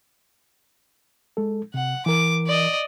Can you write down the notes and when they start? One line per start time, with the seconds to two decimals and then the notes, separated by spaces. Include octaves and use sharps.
1.37 G#3 A4
1.74 C3 F#5
2.06 E3 A#4 D6
2.47 D5 D#5